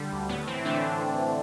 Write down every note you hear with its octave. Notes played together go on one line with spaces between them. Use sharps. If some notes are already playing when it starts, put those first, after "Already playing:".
Already playing: D3 G3
D2
A2 B3
E3 C4
D3 A3 D4